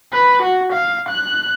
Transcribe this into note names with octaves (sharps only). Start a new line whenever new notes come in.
B4
F#4
F5
F#6